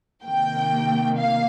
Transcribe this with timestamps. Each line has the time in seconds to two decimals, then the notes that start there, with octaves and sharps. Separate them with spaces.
0.25 C3 D#3 A#3 G5
1.18 F5